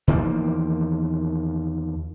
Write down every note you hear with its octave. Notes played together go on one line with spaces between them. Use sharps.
E2 D#3 F3 A#3